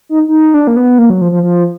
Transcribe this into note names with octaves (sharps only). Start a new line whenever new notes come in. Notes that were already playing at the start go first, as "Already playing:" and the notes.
D#4
D#4
D4
A#3
B3
A#3
F#3
F3
F3
F3